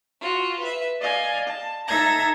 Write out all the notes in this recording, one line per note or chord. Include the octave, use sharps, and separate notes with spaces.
F4 F#4
B4 E5
D5 D#5 F5 G#5
A5
D#4 A4 E5 A#5 G#6 A#6